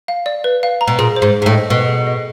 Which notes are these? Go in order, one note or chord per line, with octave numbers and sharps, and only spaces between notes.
F5
D5
B4
F5
A#5
B2
A#2 G#4
C5
G#2
C5
G#2
A2
D#5
B2 D#5
G#4
D#5